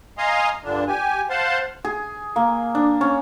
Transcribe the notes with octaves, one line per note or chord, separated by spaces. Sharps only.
D#5 F5 G#5 A#5 C6 D#6
G2 A#2 D3 D4
G4 G#5
C5 F5 F#5 A5 C6
G#4
A#3
D4
C#4